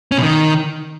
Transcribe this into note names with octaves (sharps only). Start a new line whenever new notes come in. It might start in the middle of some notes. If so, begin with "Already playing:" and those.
C#4
B2
D#3